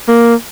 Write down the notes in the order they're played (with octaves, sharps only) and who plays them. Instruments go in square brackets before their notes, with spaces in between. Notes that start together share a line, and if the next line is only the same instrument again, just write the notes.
[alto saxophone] A#3